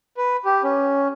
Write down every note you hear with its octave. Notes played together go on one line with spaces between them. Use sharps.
B4
G4
C#4